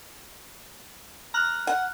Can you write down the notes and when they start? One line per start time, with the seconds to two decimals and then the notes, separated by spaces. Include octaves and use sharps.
1.34 A#5 F6 F#6
1.67 F#5